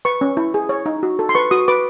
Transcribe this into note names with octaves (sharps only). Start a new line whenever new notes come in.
B4 C#6
C#4
E4
G#4
C#5
D#4
F#4
A4
C6
B4 C#6
F#4 D#6
B4 D6